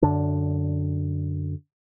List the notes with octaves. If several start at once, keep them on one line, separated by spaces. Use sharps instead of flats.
F#2 D3 D4